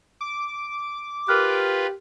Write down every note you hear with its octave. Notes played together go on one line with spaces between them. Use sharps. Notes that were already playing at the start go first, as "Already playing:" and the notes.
D6
F4 G4 A#4 B4 F6 F#6